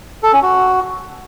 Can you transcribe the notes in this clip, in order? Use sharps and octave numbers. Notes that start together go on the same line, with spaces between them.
A4
C#4
F#4